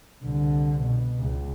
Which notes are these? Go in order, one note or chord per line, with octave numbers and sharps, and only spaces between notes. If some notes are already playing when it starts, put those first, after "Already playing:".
C2 D3
B2
C#2